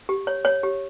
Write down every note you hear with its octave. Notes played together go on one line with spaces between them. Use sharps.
G4
C#5
C#5
G4